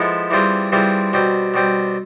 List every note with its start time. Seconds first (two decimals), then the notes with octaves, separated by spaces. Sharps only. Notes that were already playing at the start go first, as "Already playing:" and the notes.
Already playing: F3 G#3 B3 E4 A4
0.30 E3 G3 C4 F4 G#4
0.72 E3 G3 C4 F4 G#4
1.13 B2 G3 C4
1.54 B2 G3 C4